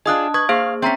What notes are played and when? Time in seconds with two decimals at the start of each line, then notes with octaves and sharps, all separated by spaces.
0.06 D4 F4 G#4 D#5 D#6 F#6
0.34 B4 C#6 D#6 G#6
0.49 A#3 G#4 C5 F5
0.82 C4 C#4 E5 A#5 B6